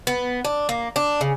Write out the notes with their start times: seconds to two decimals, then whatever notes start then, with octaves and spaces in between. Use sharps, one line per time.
0.07 B3
0.45 D4
0.69 A#3
0.96 D4
1.21 C#3